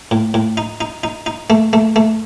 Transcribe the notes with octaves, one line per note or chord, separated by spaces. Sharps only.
A2
A2
D#4
D#4
D#4
D#4
A3
A3
A3